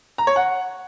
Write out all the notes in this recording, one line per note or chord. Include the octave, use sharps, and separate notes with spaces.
A#5
C#5
F#5